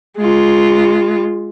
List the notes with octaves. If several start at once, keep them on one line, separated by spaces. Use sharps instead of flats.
G#3 F4